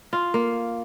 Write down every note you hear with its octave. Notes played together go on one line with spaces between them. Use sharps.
F4
A#3